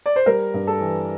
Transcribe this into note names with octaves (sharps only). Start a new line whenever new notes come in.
D5
C5
G3 A#4
G2
A4
E3